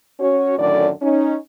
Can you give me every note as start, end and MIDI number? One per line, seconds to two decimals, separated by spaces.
0.20 0.54 61
0.20 0.54 66
0.20 0.54 73
0.58 0.90 42
0.58 0.90 45
0.58 0.90 50
0.58 0.90 51
0.58 0.90 74
1.02 1.36 61
1.02 1.36 63